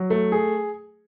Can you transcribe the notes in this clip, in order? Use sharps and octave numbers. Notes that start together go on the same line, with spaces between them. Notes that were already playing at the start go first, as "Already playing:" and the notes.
Already playing: F#3
A3
G#4